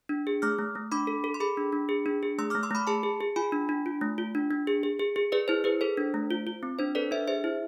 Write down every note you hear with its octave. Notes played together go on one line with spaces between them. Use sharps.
D4
G#4
A3 D6 F6
A3
A3
D4 B5 D6
A4
A4
C6
G#4 B5 D6
D4
D4
G#4
D4
G#4
A3 C6 E6
A3 D6 F6
C6 E6
A3 B5 D6
G#4 A5 C6
G#4
G#4
F4 G#5 B5
D4
D4
F4
A3
F4
D4
D4
G#4
G#4
G#4
G#4
G#4 B4 D5
E4 C5
G#4 B4
A4 C5
D4
A3
F4
F4
C4
D4 C5
A4 B4 D5
D4 C5 E5
G#4 C5 E5
E4